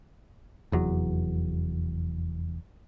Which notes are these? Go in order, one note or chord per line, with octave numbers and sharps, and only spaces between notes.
F1 E2 F#3